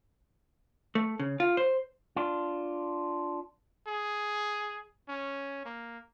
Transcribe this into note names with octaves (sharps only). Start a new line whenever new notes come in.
A3
C#3
F4
C5
D4 F4
G#4
C#4
A#3